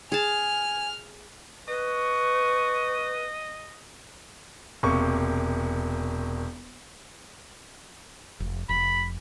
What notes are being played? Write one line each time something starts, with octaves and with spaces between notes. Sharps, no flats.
G#4 G#5 A5 F6
B4 D#5 C#6
E1 C3 A#3 C#6
F1
F1 B5